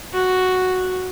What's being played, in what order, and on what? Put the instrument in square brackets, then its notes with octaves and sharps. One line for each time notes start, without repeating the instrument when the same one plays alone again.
[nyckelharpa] F#4